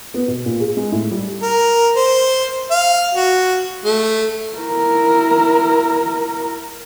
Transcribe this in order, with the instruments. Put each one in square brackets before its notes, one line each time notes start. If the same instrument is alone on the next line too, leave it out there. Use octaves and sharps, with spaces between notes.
[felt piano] B3
B2
A#2
G#4
G#3
A2
G3
[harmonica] A#4
C5
F5
F#4
A3
[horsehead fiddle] E4 A#4